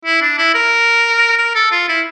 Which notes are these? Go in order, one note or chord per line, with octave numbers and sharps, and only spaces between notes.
E4
D4
E4
A#4
A#4
A4
F4
E4